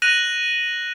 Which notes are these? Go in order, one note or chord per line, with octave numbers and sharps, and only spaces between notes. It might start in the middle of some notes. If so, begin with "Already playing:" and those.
F#6 A#6 D#7 F7 F#7